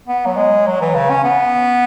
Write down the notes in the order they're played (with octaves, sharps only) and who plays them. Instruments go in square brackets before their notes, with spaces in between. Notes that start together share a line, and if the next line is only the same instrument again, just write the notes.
[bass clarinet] B3
F#3
G#3
F#3
E3
C#3
C#4
B3